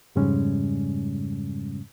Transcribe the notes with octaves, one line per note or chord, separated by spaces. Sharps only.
F2 G#2 C#3 G3 G#3 C#4